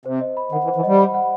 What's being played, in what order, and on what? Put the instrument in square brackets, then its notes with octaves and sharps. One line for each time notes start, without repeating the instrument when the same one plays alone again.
[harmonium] C3 [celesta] C5
[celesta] D#5
B5
[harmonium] D#3 [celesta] F#5
[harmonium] E3
[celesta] C5
[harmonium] E3
[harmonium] G3 [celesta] D#5
[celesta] B5
F#5